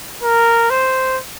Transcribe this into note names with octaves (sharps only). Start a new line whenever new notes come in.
A#4
C5